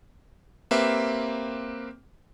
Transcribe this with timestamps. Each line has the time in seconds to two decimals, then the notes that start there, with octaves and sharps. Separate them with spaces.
0.71 A#3 C4 G4 B4 E5